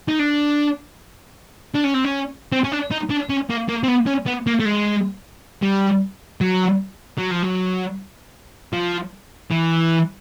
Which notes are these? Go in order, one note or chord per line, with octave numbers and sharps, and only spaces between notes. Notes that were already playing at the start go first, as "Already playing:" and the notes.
D#4
D4
D4
C#4
C4
C#4
C4
C#4
D4
D#4
D4
C#4
A#3
A#3
C4
B3
C#4
B3
A#3
A3
G#3
G3
F#3
F#3
F3
F#3
F3
E3